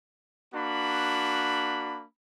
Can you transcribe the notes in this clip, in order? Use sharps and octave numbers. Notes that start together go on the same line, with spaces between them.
A#3 D4 F#4 B5